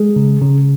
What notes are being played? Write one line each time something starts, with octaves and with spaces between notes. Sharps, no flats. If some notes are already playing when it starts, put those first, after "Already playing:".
Already playing: G#3 G#4
C#3
C#3